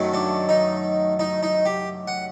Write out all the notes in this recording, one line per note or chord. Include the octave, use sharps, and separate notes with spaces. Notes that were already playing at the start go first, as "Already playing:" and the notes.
Already playing: F#2 D#3 F#3 A3
D4
D#4
D#4
D#4
G4
F#5